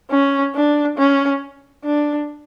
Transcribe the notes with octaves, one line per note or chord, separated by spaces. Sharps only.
C#4
D4
C#4
D4